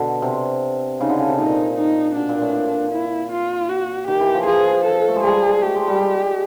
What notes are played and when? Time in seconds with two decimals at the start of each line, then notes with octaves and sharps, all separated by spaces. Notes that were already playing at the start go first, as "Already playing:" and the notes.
Already playing: B2 D3
0.22 C3
0.99 C#3 D#4
1.10 D3
1.19 C#3
1.28 C3
1.38 A#2 D#4
1.77 D#4
2.16 B2 D4
2.29 A#2
2.42 A2
2.54 A#2
2.92 E4
3.32 F4
3.69 F#4
4.08 D#3 G4
4.20 E3
4.34 F3
4.47 F3 G#4
4.86 A4
5.08 A3
5.16 G#3
5.24 G3 G#4
5.43 G#3
5.62 A3 G4
5.75 G#3
5.88 G3
6.01 G#3